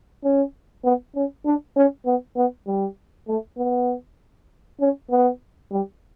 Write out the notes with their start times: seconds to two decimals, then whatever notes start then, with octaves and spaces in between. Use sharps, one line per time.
0.24 C#4
0.84 B3
1.15 C#4
1.45 D4
1.76 C#4
2.06 B3
2.36 B3
2.67 G3
3.28 A3
3.57 B3
4.80 C#4
5.10 B3
5.71 G3